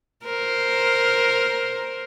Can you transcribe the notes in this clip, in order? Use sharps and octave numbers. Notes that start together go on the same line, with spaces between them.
A#4 C5